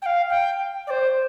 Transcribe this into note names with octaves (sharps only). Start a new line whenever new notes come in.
G5
F5
G5
D5
C5